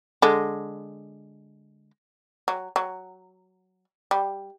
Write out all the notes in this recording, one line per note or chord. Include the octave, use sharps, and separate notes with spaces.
D3 G#3
F#3
F#3
G3